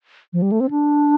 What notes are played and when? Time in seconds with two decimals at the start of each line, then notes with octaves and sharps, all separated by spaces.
0.33 F3
0.42 G3
0.51 A3
0.60 C4
0.70 D4